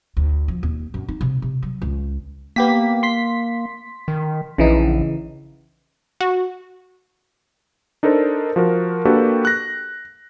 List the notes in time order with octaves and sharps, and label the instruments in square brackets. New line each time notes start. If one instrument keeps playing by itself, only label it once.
[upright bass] D2
F3
D#2
F#2
D#4
C3
C3
F#3
C#2
[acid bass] A#3 [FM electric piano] B3 G4 B6
[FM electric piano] C6 B6
[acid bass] D#3
[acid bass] A#1 [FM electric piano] C#3 E3 D#4
[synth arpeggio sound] F#4
[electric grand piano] D4 D#4 A4 A#4 C5
F3 F#4 A#4
A#3 D4 F#4 G4 A4 B4
F#6 A#6